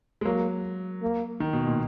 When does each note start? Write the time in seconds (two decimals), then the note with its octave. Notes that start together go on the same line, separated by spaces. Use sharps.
0.21 G#3
0.25 F#3 A#3
1.02 A#3
1.40 D#3
1.53 B2
1.66 A#2